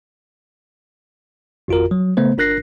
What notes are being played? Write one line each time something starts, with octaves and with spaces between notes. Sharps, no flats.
G#1 F2 F4 F#4 A#4
F#3
C#3 A3 B3 C5
G1 D4 A#4 F#6 A#6 C7